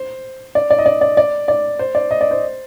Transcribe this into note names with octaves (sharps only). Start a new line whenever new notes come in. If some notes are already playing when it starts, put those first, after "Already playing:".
Already playing: C5
D5
D5
D#5
D5
D5
D5
D5
C5
D5
D#5
D5
C5